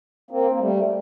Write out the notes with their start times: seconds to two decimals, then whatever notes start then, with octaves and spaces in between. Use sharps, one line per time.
0.31 A#3 C4
0.51 A#3
0.60 G3 A3